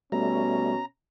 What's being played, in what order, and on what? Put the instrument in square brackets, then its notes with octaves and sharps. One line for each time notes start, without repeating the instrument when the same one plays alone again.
[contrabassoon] B2 [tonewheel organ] G3 A3 [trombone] C#4 [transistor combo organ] A#5